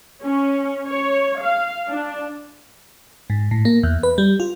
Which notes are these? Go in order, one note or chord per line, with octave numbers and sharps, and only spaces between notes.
C#4
C#5
F5
D4
G#2
A2
A#3
E2
B4
G3
F4